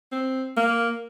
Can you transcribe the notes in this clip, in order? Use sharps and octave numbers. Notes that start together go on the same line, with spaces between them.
C4
A#3